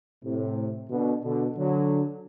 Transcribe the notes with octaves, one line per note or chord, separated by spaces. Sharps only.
A2 C3
B2 D3
B2 D3
D3 F#3